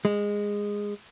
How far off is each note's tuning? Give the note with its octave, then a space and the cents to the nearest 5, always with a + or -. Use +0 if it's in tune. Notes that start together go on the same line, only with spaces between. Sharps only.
G#3 -15